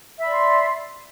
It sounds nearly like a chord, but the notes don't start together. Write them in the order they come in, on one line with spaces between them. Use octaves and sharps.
E5 B5 D5 C6